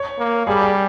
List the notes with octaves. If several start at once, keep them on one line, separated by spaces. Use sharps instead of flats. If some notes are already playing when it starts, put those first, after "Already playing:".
Already playing: C#5
A#3
G3 G#4
G#4